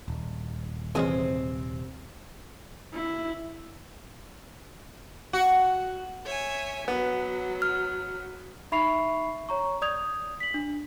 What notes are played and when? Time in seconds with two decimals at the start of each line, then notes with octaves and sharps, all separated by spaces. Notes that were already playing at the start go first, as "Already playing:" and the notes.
0.08 D#1
0.95 E2 C3 G#3 C4 C#4 G#5
2.94 E4
5.33 F#4
6.24 C#5 E5 G#5
6.88 F#3 B3
7.62 F6
8.72 D#4 E5 B5 C#6 C7 F7
9.49 C#5 A#5 C#6
9.82 D5 D#6 G6 G#6 F7
10.40 B6 F#7
10.54 D4